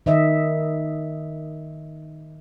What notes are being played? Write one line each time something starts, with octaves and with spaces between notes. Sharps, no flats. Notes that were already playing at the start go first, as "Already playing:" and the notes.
D#3 D#5 E5